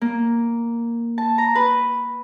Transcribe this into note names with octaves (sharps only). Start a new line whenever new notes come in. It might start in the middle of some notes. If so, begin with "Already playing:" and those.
A#3
A5
A#5
B4